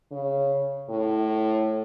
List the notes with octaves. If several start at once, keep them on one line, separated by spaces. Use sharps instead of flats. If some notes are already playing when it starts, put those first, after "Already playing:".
C#3
A2